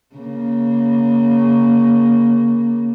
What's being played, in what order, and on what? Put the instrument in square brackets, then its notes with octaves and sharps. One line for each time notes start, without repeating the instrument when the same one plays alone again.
[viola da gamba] C#3 A#3